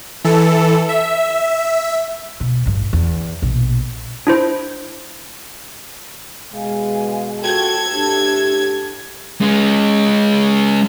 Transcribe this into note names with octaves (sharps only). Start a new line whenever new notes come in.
E3 A4
E5
B2
A1 G2
E2
A#1 B2
D4 E4 C5
B2 G#3 F5 G#5
F4 F#4 A4 G5 G#6
A2 D4 G4
G#3 C#4